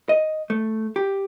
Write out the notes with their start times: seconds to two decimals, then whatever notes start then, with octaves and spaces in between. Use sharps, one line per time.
0.09 D#5
0.50 A3
0.96 G4